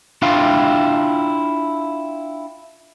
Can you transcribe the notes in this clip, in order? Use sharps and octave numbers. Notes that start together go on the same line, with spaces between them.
D4 E4 F4 F5 G5